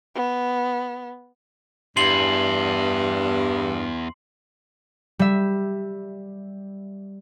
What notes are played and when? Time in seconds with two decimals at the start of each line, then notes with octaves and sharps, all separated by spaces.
0.15 B3
1.97 E2 G2 C6 C7 F#7
5.19 G3 E5